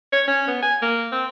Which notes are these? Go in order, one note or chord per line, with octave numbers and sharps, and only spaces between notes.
C#5
C#4
B3
G#5
A#3
C4